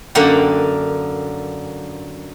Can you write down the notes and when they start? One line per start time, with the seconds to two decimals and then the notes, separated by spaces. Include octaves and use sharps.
0.15 F#2 D3 A#3 D5 F#5 G5